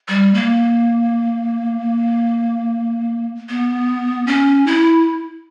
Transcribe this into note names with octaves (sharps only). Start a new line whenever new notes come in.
G3
A#3
B3
C#4
E4